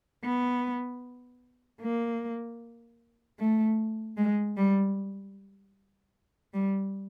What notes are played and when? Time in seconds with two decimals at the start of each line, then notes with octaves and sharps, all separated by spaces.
0.24 B3
1.81 A#3
3.39 A3
4.17 G#3
4.57 G3
6.54 G3